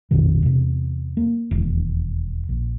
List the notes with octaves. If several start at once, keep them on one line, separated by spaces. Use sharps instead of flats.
A#1 F2 B2 D#3
E2 C3
A#3
E1 D#2
A#1